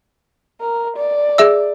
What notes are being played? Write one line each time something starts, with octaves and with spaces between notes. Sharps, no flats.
A#4
D5
G#4 E5 E6